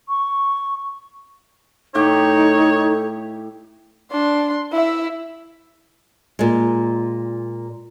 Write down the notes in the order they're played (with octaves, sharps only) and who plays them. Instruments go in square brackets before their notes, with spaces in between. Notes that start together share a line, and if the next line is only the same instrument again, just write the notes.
[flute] C#6
[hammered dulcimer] A2 G4 G5 [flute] D#4 [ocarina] A4 [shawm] C#5
[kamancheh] D4 C6
E4 E5
[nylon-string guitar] A#2 G#3